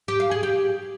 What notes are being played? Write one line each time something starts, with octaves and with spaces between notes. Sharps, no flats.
G4
F5
G#4
G4